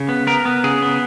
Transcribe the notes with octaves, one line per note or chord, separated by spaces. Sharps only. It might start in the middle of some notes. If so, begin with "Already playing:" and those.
Already playing: C#3
B3
B3 A#4
B3
C#3 G#4
B3